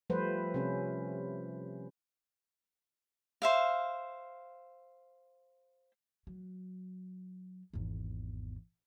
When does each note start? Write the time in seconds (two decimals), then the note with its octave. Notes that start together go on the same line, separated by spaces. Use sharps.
0.10 F3 G3 A3 B4 C5
0.54 C3 C#4
3.42 C5 E5 F5
6.27 F#3
7.73 G#1 E2